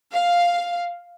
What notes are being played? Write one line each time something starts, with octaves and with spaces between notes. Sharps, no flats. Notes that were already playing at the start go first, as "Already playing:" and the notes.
F5